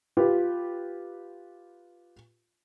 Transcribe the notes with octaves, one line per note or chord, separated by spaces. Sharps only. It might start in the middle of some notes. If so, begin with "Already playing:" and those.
F4 G4 B4